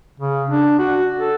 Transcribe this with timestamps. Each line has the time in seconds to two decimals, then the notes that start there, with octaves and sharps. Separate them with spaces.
0.20 C#3
0.50 D4
0.79 F#4
1.19 A4